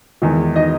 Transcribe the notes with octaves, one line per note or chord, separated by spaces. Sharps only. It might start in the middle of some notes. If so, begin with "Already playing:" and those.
E2 D#3 G#3
D#4 D#5